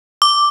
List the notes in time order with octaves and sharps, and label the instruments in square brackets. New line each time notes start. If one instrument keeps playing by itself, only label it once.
[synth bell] D6